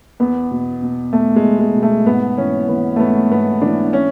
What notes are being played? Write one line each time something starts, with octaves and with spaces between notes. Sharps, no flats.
E2 B3
B2
B2
E2 A3
G#3
E2
G#3
B2
A3
G#2 B3
E3 C#4
E3 B3
A3
G#2 B3
G#2 B3
E3 D4
C#4